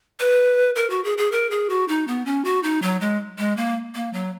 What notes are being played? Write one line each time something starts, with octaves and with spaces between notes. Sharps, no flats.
B4
A#4
F#4
G#4
G#4
A#4
G#4
F#4
D#4
B3
C#4
F#4
D#4
F#3
G#3
G#3
A#3
A#3
F#3